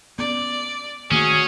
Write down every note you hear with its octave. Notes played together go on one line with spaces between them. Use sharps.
B3 C#4 D5
D#3 A3 A#3 C#4 F#4 G#4